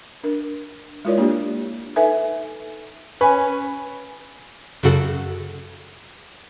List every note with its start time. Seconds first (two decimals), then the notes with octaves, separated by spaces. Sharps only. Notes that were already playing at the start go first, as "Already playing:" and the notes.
0.24 D4 A#4
1.05 G#3 E4 F4 A#4 C#5 D5
1.18 A#3 D4 F4 G4
1.96 D#4 A4 B4 E5 G#5
3.21 C#4 B4 G#5
4.83 F#2 C#3 F#4 A4 F#6